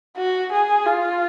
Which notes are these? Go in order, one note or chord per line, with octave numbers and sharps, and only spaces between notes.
F#4
G#4
F4